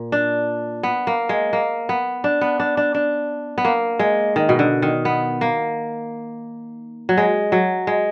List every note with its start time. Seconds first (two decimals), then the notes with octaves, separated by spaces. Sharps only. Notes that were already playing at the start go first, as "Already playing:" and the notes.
Already playing: A#2
0.12 D4
0.83 B3
1.07 A#3
1.29 G#3
1.53 A#3
1.89 B3
2.24 D4
2.41 B3
2.60 D4
2.77 D4
2.95 D4
3.58 B3
3.65 A#3
3.99 G#3
4.36 D#3
4.49 B2
4.59 D3
4.82 D#3
5.05 B3
5.41 A#3
7.09 F#3
7.17 G#3
7.52 F#3
7.87 G#3